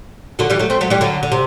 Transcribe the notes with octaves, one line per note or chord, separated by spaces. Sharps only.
D3 F#3
E3 G3
F#3 A3
A3 C4
F#3 A3
E3 G3
D3 F#3
D3
C3